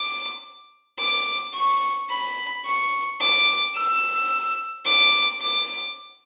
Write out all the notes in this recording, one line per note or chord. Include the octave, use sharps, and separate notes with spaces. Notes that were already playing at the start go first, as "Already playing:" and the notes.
Already playing: D6
D6
C#6
B5
C#6
D6
E6
D6
D6